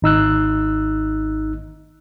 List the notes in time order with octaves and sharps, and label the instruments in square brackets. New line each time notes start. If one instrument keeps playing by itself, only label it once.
[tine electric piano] G#1 D#4 E6 F#6